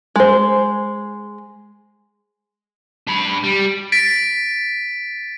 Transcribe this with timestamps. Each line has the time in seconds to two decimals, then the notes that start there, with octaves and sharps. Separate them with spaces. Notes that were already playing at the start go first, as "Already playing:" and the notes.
0.16 G#3 C5
3.07 D4 B5
3.44 G3
3.92 A6 B6 D7